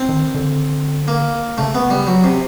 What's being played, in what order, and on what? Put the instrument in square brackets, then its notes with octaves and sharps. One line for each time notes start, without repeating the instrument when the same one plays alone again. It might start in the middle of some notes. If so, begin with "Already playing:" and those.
Already playing: [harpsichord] C4
[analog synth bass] D#3
D3
[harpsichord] A#3
[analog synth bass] C#3 [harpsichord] A3
[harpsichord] B3
G3
F#3
C3